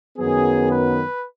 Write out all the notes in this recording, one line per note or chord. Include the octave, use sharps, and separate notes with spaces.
F#2 D#3 F#3 B3 G#4
B4